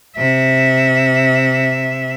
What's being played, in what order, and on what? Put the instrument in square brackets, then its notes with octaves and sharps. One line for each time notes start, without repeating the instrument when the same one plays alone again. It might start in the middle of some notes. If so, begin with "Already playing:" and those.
[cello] C3 E5